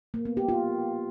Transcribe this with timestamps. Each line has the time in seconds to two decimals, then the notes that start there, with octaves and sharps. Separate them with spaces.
0.14 A#3
0.25 B3
0.37 G4
0.49 F4